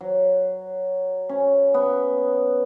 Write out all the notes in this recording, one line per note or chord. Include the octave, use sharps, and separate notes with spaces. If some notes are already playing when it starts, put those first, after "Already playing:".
F#3
C#4
B3